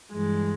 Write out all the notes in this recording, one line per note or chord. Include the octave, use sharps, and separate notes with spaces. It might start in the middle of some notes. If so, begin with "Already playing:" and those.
G2 E3 G#3